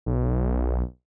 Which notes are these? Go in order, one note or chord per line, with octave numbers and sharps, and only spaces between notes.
B1